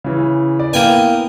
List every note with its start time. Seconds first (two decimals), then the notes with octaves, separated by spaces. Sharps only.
0.04 C#3 E3
0.59 D5
0.73 A#3 B3 E4 G5 G#5 D#7